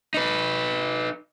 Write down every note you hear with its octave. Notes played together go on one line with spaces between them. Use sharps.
D#4 B4